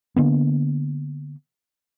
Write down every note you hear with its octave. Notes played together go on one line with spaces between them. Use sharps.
D3 A#3 B3